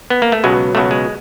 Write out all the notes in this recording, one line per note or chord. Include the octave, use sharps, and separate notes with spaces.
B3
A#3
A3
C#2 B2 F#3 G#3
C#2 B2 F#3 A3
G#3